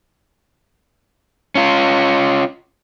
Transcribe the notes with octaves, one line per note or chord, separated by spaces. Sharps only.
C#4 F4